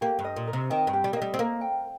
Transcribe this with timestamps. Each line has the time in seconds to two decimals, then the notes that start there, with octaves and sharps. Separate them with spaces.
0.01 A#3 G4
0.19 G2
0.24 D#5
0.36 A#2
0.47 A#4
0.53 C3
0.70 D#3 G5
0.87 G2
0.93 G4
1.04 G3
1.13 A#3
1.16 D#5
1.22 G3
1.34 C4
1.39 A#3 A#4
1.61 G5